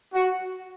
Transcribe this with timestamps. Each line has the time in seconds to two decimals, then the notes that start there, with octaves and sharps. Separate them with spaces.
0.13 F#4